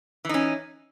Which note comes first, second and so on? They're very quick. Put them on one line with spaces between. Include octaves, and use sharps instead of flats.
E3 D#4 C#4